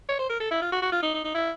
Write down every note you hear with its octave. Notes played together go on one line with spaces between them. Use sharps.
C#5
C5
A#4
A4
E4
F4
F#4
F#4
F4
D#4
D#4
D#4
E4